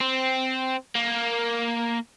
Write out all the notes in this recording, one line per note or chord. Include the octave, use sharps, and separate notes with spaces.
C4
A#3